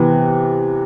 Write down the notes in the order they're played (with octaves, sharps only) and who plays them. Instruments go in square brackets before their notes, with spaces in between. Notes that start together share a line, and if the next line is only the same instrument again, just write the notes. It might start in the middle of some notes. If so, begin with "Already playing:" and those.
Already playing: [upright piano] C3 E3 B3